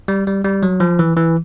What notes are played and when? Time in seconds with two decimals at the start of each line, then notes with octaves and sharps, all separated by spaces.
0.08 G3
0.27 G3
0.45 G3
0.63 F#3
0.80 F3
0.99 E3
1.17 E3